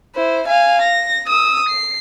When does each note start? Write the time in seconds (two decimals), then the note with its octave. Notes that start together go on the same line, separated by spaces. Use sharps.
0.15 E4 C5
0.47 F5 G#5
0.82 A#6
1.27 D#6 E6
1.69 C7